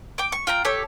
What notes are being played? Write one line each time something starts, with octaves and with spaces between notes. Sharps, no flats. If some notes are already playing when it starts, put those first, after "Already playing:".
G5 D6
C#6
F4 G5 A#5
G4 A4 C#5